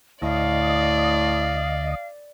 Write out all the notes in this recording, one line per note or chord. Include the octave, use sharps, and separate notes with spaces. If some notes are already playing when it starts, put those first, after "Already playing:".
D2 A2 D5 D#5 F5